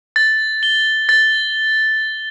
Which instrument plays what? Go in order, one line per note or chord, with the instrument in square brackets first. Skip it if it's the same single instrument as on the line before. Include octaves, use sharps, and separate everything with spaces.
[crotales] A6
G7
A6